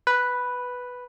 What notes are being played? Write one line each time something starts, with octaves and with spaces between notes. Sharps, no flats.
B4